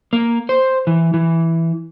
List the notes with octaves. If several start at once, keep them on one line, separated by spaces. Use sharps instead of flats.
A#3
C5
E3
E3